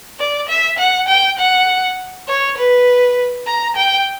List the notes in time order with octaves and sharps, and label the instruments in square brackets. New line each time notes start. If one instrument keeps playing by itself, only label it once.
[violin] D5
E5
F#5
G5
F#5
C#5
B4
A#5
G5